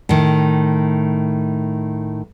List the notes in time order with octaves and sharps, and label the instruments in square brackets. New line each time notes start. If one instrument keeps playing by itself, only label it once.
[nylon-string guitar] A2 D#3